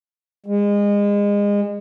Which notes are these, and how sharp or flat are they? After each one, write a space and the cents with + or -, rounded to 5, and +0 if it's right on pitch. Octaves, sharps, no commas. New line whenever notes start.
G#3 -30